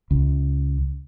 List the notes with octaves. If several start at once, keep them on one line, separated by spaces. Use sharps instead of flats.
C#2